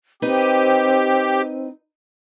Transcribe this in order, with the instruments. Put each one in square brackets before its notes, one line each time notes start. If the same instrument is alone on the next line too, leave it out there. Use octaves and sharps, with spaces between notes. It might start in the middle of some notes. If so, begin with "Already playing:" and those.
[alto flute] C4 [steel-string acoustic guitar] D#4 B4 D#5 [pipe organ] G4